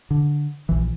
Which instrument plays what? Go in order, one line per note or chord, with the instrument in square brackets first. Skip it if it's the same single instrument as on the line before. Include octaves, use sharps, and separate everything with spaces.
[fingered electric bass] D3
A#1 E3